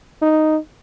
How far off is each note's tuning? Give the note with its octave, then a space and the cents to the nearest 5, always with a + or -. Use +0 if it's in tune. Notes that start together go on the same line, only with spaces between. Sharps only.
D#4 +0